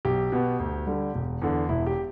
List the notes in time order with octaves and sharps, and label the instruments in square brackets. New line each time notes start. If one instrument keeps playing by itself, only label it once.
[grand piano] B1 G4
B2 B3
D2
D3 G3
E1
E2 D3
E1 E4
G4